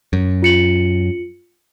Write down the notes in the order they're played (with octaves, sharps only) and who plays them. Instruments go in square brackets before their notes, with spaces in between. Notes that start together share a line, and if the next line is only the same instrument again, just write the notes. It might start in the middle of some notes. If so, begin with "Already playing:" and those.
[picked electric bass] F#2
[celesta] F4 C#7 F#7